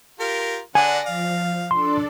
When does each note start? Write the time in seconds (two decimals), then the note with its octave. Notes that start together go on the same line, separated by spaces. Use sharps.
0.20 F4 G4 A#4
0.75 D3 D4 D5 F#5 G#5 A#6
1.06 F3 F5
1.71 D4 A4 D5 C6